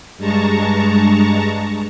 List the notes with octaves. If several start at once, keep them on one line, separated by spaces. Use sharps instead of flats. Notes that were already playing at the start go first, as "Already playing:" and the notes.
G2 G#3 A5 A#5 C#6